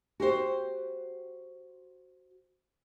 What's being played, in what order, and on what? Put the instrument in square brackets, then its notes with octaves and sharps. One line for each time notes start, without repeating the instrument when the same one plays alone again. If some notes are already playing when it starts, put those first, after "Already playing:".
[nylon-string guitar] F#4 G4 C5